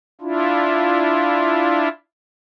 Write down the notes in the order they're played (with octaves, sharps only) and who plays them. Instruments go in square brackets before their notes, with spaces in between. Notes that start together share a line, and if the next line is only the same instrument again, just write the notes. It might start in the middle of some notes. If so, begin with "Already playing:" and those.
[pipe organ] D4 E4 F4